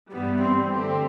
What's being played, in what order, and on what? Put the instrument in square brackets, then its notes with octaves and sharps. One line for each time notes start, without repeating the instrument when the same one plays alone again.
[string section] G2 E3 G3 [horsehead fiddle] B3
[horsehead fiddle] C4
[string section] D3 A3 C4 G4